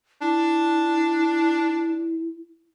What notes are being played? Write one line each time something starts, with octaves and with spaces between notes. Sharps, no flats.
D4 E4